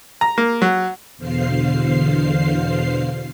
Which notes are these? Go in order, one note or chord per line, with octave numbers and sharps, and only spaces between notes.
A#5
A#3
F#3
E2 B2 D3 C5 F5 C7